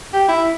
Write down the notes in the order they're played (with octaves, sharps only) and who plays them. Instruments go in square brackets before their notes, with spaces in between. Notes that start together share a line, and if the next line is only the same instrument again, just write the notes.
[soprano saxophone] G4
E4